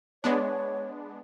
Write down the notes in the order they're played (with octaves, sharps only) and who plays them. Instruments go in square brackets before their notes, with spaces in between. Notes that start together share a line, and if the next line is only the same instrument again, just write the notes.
[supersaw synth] G#3 B3 D4 [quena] C#5